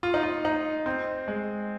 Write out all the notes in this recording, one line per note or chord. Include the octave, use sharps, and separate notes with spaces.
F4
D#4
F4
D#4
C4
G#3